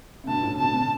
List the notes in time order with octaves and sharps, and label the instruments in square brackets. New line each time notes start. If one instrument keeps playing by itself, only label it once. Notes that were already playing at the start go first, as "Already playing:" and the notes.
[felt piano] C#3
[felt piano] G2 B2 [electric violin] A5
[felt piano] A2 C#3
[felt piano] B2 D3 [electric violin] A5
[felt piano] B2 D3